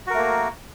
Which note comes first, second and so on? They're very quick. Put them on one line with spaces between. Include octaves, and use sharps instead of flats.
F#4 A#4 A3 A#3